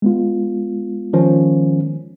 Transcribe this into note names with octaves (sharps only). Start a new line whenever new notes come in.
G#3 B3 F4
D#3 F3 C#4